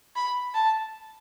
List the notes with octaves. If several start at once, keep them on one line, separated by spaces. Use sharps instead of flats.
B5
A5